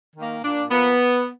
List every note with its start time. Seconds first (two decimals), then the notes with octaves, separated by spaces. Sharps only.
0.16 D#3 A#3
0.44 A#2 D4
0.71 F3 A#3 B3